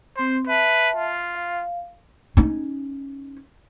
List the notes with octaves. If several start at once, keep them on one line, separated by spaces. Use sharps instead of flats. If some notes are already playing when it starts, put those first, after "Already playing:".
C4 C5 C6
B4 E5 A5
F4
F5
C#4 D#4